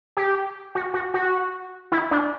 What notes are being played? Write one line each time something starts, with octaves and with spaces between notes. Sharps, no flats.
G4
F#4
F#4
F#4
E4
D4